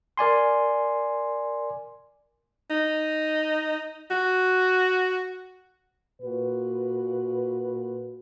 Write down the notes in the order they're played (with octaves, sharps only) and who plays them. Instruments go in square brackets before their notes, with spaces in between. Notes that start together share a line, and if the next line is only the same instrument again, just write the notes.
[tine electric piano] A#4 D5 G#5 C6
[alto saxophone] D#4
F#4
[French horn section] A#2 F#4 B4